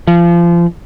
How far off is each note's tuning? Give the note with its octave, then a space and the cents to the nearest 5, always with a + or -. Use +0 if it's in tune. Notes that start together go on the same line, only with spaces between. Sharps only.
F3 -30